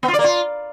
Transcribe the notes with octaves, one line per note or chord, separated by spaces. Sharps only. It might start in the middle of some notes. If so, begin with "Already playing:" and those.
B3
F4
D5
A#3
F4